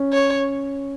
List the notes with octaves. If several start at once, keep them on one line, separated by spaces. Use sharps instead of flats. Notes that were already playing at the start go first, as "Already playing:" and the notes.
Already playing: C#4
C#5